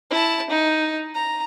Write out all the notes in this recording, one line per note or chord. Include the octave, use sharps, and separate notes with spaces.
E4 A5
D#4
A#5